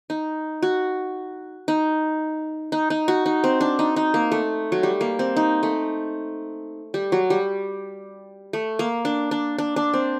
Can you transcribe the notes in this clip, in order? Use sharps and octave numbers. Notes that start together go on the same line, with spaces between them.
D#4
F#4
D#4
D#4
D#4
F#4
D#4
C4
D4
D#4
D#4
A#3
A3
F#3
G3
A#3
C4
D#4
A3
G3
F#3
G3
A3
A#3
D4
D4
D4
D4
C4